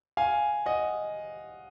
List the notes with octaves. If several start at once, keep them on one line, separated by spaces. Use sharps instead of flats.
F5 G#5
D#5 F#5